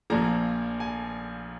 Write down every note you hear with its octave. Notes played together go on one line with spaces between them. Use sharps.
A#1 A#2 F3 A#5
G#5